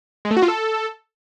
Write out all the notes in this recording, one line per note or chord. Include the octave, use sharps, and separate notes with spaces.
G#3
A3
F#4
F4
A4